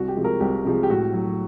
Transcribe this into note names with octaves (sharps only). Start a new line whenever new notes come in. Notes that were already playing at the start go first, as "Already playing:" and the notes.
Already playing: C2 F#4
G4
C3 F3 G#3
A#4
C2 G4
C3 F3 G#3
G4
A2 F#4
F#3